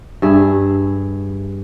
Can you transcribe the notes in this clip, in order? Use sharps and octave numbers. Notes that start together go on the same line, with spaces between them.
G2 G#4 E5